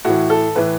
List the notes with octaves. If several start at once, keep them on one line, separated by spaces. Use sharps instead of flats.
A2 E3 F#4
A4
A2 E3 B4